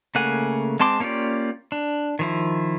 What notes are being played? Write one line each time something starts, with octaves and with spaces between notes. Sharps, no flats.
C#3 A3 A#3 F#5 G#5
G#3 C4 A5 C6 D6
A#3 C#4 F4 G4 D5
D4
D#3 F3 E4